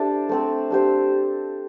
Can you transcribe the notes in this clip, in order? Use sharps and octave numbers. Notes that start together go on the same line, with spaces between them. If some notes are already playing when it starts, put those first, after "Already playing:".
Already playing: D4 E4 G4 A4 C5 D5 E5
A3 C4 A4
D4 G4 C5